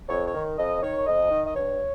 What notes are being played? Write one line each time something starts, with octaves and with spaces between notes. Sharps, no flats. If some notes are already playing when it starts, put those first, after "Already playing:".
F2 C#5
C#5
D#3
F2 D#5
D#3 C#5
F2 D#5
D#3
D#5
G2 C#5